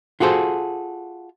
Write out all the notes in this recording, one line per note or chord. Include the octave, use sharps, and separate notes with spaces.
F4 F#4 G#4 A4 C5